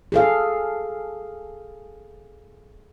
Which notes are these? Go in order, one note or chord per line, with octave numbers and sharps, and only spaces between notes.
G#4 A4 F5